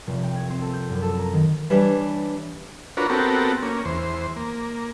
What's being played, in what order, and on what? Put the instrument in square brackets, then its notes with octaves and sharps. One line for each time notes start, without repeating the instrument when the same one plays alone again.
[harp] F1
G5
G#6
C4
A4
G6
F#2
A4
A#5
D#3
[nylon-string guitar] E3 G3 D4 C#5 D5
[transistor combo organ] D4 F4 F#4 A#4 B4 C#5
B3 C4 F#4 G4 A4 A#4
A#3 C#4
E2 C5
A#3